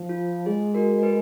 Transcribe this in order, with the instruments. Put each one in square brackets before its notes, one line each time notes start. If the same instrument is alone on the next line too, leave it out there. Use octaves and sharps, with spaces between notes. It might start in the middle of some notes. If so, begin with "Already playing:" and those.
Already playing: [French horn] F3
[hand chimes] F4
[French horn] G#3 [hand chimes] G#4
[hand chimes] F#4 A#4
A#4
G#4 B4